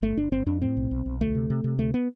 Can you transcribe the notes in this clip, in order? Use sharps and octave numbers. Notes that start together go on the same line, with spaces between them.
G1 A3
G1 D4
G1 C4
F2 D4
A2 C4
B1
B1
B1
D2 A3
C3
C3
C3
D2 A3
B3